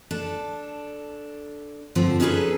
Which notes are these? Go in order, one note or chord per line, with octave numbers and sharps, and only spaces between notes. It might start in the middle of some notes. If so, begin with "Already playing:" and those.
D4 A4
G2 D3 F3 C4
B3 C#4 D#4 G#4 A4 B4